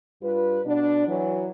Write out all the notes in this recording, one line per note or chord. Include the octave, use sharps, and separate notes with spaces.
G2 G3 F4 B4
B2 D4
E3 F#3